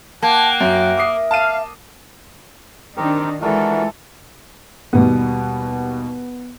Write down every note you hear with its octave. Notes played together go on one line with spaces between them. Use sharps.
A#3 F#5 G5 A5
F#2 E5
D6 D#6 C7
F5 A5 D#7
D#3 C4 D4 D#4 G4 A#4
E3 G#3 D4 F4 F#4 A4 A#4
D#2 B2 G3 B3